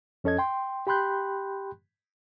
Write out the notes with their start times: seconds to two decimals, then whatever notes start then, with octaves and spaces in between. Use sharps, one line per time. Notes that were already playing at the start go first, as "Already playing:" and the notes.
0.24 F2 C#4 A4 D#5 G#6
0.38 G5 C6
0.87 G4 G5 B5 C6 F#6 G6